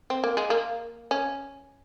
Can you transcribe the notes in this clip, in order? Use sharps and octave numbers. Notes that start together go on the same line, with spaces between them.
C4
A#3
G#3
A#3
C#4